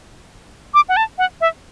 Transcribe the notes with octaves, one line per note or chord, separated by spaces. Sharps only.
D6
F#5
A5
F#5
E5